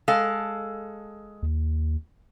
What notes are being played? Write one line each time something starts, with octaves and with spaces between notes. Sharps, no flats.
G#3 A4 F5
D#2